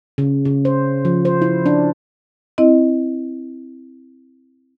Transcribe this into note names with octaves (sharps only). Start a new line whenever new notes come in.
C#3
C#3
C5
F3
C5
E4
D4
C4 E4 D#5